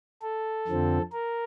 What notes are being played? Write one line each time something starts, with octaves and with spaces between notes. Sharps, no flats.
A4
F2 D3 F3 C4
A#4